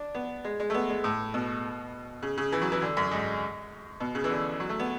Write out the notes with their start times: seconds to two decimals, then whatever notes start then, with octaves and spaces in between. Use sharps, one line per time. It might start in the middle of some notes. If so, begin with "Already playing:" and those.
Already playing: D4
0.15 B3
0.44 G#3
0.60 G#3
0.70 A3
0.74 B3
0.89 G#3
1.04 A2
1.34 B2
2.23 C#3
2.38 C#3
2.52 E3
2.62 F#3
2.72 E3
2.82 D3
2.97 F#2
3.11 G#2
4.00 B2
4.15 C#3
4.24 E3
4.30 D3
4.60 F#3
4.69 A3
4.79 B3